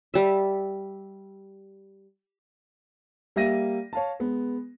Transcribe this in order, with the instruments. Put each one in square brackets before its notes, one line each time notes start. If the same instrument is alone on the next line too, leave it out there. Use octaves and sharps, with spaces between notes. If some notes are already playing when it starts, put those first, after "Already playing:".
[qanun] G3 E5
[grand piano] G3 A#3 G4 E5 A#6 D#7
C#5 F5 A5
G#3 B3